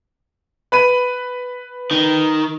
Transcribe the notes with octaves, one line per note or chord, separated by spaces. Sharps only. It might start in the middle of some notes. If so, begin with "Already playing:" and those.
B4 B5 D#7
D#3